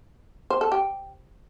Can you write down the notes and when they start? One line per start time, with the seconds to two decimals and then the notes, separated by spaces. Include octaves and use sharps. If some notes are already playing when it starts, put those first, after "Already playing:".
0.50 C5
0.61 A4
0.72 G4